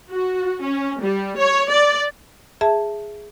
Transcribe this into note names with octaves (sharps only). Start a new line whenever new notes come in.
F#4
C#4
G3
C#5
D5
G#4 E5 A5